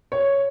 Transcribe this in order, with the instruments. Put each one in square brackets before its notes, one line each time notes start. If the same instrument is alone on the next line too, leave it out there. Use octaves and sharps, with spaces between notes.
[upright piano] C#5